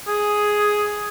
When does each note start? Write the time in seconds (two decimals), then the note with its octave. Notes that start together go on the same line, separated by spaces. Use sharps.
0.07 G#4